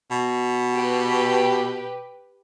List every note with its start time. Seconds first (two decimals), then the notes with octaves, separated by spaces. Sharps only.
0.11 B2
0.74 G4 B4